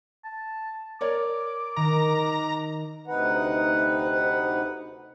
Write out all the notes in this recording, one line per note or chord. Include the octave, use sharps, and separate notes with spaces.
A5
A#4 C#5 D5 D6
D#3 A#5
D2 C3 D#4 B4 F#5